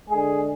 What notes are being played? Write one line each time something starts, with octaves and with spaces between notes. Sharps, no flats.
D3 G#3 G#4